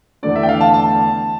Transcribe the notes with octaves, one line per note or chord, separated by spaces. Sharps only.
E2 D3 A3 D4 D5
E5
G5
F5
A5
A5